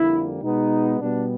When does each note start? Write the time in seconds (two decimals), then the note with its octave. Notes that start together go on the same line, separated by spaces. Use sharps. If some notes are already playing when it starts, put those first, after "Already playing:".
Already playing: F2 D3 G3 A#3 E4
0.42 B2 G#3 B3 D#4
0.99 B2 G3 B3 D4